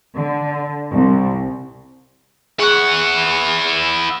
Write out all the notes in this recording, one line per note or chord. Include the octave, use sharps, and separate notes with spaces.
D3
C2
E4 G#4 F#5 C#6 F#6